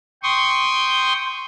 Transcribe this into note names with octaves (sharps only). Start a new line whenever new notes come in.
G5 C6 C#6 D#6